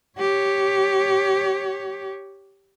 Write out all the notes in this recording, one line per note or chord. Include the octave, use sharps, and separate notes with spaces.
G4 C#5